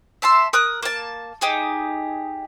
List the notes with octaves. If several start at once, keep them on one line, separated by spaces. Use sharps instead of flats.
E5 A5 C6 E6
A#4 D#6 F#6
A#3 A5
D#4 G4 G#4